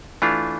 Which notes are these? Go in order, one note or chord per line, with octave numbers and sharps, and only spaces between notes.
E3 A3 D4 F4